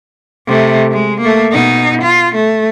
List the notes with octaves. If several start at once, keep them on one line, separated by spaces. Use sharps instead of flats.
C3 A3
G#3
A3 A#3
B2 D#4
F4
A3